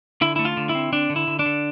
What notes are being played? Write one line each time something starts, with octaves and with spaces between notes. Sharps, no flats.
D3 E4
A3 E4
F4
D3
E4
C4
D3 D4
D3
E4
D3
D4
D3